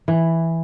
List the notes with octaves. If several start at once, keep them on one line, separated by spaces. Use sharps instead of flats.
E3